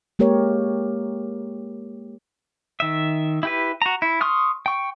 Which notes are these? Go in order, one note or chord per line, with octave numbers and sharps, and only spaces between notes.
G#3 A#3 G4 A#4 C#5
D#3 E5
E4 G4 B4
F#4 A#5
E4
C6 C#6 D#6 F6
G5 C#6